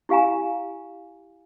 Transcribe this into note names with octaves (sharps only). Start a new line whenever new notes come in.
E4 G4 F5 G#5 A#5